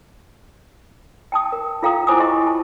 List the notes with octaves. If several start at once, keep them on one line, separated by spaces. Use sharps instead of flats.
G5 A5 D#6
A#4
F4 A4 F5 G5 A#5 D#6
E4 F4 C5 G#5 D6 D#6
F4 G4 A4 D#5 C6
F4 A5